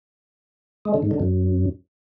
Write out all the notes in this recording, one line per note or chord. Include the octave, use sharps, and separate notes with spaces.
G#3
D3
G#2
D3
F#2